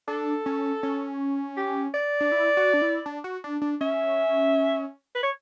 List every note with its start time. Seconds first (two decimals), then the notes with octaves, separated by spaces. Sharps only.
0.08 D4 A4
0.46 C#4
0.83 C#4
1.57 G4
1.94 D5
2.21 D4
2.32 E4
2.57 F#4
2.73 D4
2.82 E4
3.06 D4
3.24 F#4
3.44 D4
3.62 D4
3.81 C#4 E5
5.15 B4
5.23 C#5